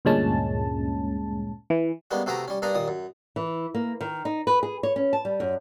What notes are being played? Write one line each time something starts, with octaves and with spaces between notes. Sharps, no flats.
D2 G2 A#2 G#3 C#4 A5
E3
G3 G#3 A#3 B3 C#4
C3 A3 F#4 G#4 B4 A#5
G3 C#4
G2 A#3 D4 A#5 D#6
D#2 A#2 D#6
F#2
E3
A#3
D#3
D#4
B4
G#4
C#5
C#4
A5
G3
F#2